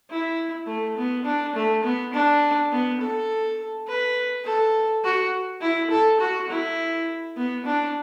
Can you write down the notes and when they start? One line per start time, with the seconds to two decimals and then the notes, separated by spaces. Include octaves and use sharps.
0.10 E4
0.67 A3
0.97 B3
1.25 D4
1.56 A3
1.84 B3
2.13 D4
2.71 B3
3.01 A4
3.88 B4
4.45 A4
5.04 F#4
5.61 E4
5.91 A4
6.20 F#4
6.50 E4
7.37 B3
7.66 D4